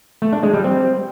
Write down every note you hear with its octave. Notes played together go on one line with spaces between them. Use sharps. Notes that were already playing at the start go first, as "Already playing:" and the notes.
A3
D4
G#3
G3
C4